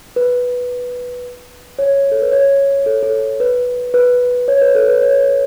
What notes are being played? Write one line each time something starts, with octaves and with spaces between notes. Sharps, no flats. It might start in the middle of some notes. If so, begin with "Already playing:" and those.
B4
C#5
A4
B4
C#5
A4
A4
B4
B4
C#5
B4
A4
B4
C#5